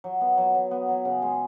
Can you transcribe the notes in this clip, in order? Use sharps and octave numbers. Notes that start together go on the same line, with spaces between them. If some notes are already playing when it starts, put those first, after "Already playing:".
F#3
B3
F#3
F#3
B3
F#3
C#3
G#3